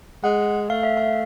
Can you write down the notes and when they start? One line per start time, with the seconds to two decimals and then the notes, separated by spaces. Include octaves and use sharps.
0.24 G#3 F#5
0.69 A3 F5
0.83 E5
0.97 F5